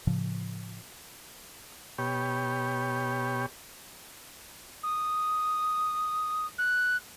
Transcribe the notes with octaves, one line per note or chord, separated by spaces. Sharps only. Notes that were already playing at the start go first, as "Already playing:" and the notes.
A2 C#3 F3
B2 G4 C#5
D#6
F#6